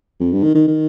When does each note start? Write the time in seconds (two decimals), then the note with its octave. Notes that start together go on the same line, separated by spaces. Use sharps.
0.20 F2
0.33 G2
0.44 D#3
0.55 D#3
0.68 D#3